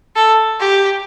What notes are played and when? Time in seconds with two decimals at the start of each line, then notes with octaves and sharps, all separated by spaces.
0.16 A4
0.60 G4